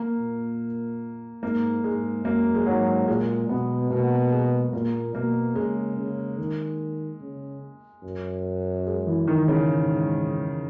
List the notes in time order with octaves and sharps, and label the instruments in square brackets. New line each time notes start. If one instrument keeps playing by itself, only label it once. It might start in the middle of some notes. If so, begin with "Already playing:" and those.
Already playing: [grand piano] A#3
[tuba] A#2
[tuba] G#2 [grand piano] A#3
[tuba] G#2 [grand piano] G#3
[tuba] F#2 [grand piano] A#3
[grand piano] G#3
[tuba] G#2 [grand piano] F#3
[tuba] A#2 [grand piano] G#3
[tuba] B2 [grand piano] B3
[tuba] B2 [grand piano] A#3
[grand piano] G#3
[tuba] A#2 [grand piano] A#3
[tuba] B2 [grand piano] A#3
[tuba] C#3 [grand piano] G#3
[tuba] C#3
D#3
C#3
F#2
[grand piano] G#3
E3
D#3
C#3
[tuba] G#2